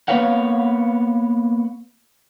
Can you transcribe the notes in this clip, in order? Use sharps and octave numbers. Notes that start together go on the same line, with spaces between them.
A#3 B3 B4 C#5 F5 F#5